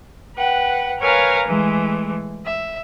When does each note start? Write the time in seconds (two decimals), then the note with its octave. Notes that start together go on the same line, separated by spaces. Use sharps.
0.38 B4 F#5 G5
1.00 A#4 B4 C#5 F5 G#5 A#5
1.48 E3 G#3 A3
2.45 E5